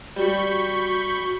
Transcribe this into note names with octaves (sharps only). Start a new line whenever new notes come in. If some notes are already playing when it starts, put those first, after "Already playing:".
G3 F#4 B5 C#6 G6